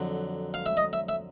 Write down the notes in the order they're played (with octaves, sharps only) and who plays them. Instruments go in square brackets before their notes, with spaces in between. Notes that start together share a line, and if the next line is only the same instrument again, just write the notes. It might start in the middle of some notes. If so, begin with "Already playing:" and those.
Already playing: [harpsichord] F2 D3 F#3
F5
E5
D#5
E5
E5